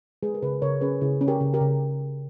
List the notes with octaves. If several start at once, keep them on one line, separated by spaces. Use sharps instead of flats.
G#3 G#4 B4
A#4
C#3 G#4 B4
C#3 A#4 C#5
C#4 G#4 B4
C#3 E4 G#4
C#4
G4 A#4
C#3
G4 A#4
C#3